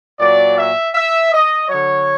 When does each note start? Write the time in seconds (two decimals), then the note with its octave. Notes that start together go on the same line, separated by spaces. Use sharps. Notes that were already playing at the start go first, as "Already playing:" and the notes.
0.19 A#2 F#3 D5
0.57 E5
0.94 E5
1.31 D#5
1.68 D3 F#3 C#5